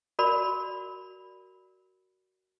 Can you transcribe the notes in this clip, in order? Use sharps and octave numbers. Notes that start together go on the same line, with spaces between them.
F#4 A#4 D5 B5